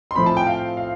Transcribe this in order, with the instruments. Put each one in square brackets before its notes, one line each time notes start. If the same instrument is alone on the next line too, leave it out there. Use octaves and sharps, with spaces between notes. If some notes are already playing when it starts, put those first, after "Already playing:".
[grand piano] C6
A2 F3 A3 C4 B5
A5
G5
F5
F5